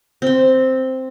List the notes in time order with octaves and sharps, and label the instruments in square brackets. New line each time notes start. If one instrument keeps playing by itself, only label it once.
[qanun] C4 C6